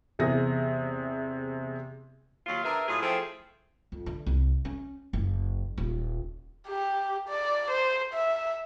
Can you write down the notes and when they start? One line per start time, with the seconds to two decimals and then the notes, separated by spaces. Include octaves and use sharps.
0.19 E2 C3 G#4 A#6
2.46 D#2 F#3 F4
2.63 D4 G#4 A#4 B4 E5
2.87 A2 F#3 F4 G#4
3.00 F3 A3 C4 E4 G#4
3.92 F2
4.06 D3
4.26 C2
4.65 C#4
5.13 F#1
5.78 D#1
6.68 G4
7.28 D5
7.71 C5
8.14 E5